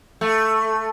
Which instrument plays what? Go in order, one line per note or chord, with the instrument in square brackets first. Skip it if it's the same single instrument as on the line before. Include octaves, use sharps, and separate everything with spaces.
[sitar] A3